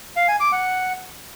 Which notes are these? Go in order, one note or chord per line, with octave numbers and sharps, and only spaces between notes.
F5
G#5
D6
F#5